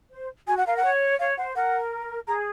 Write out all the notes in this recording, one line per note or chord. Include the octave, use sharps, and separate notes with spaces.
C5
F#4 G#5
F#5
A#4 F5
F#5
C#5
C#5 F5
C5 F#5
A#4 F#5
G#4 A#5